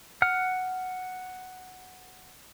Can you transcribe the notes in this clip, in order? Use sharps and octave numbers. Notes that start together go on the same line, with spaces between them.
F#5 F6